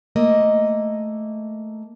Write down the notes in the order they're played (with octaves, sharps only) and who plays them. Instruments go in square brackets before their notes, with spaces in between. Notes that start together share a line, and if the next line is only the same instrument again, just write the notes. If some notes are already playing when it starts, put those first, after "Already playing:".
[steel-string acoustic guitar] A3 A#3 D#5